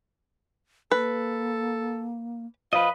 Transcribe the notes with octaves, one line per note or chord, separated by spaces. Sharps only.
A#3 A4 B4
F3 B4 D#5 F5